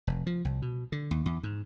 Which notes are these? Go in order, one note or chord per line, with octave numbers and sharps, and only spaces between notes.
F1
F3
C2
B2
D3
D#2
E2
G#2